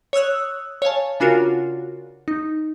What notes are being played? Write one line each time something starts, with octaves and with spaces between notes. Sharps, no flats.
C#5 D#6 E6 F#6
C#5 F5 G#5 A5
C#3 D4 F4 F#4 A#4
D#4